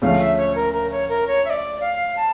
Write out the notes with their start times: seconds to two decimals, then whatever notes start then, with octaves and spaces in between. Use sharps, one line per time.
0.02 D2 C#3 F3 A3 C#4 F5
0.20 E5
0.37 C#5
0.55 A#4
0.73 A#4
0.91 C#5
1.09 A#4
1.28 C#5
1.45 E5
1.50 D5
1.81 F5
2.16 A5